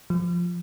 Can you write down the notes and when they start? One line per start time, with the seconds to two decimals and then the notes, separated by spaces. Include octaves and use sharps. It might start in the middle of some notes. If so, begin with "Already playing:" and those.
0.10 F3